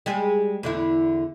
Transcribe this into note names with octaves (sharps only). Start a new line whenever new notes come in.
G3 G#3 G#4
E2 D3 E4